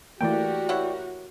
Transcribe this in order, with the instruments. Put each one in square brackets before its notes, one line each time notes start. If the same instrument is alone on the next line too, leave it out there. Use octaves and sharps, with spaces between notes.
[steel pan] E3 A3 A#3 [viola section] F#4 G4 A#4 [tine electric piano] D5 G5
[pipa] E4 C#5 F#5